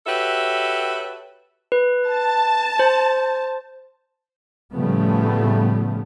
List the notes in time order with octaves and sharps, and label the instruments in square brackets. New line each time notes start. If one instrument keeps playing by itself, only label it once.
[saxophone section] F#4 G4 A4 B4 C#5 E5
[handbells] B4
[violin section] A5
[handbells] C5
[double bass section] A2 C#3 F3 G3 A3 B3